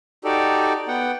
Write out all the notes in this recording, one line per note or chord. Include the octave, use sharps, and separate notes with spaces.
D#4 F#4 G4 A4 D5
B3 F#5 G5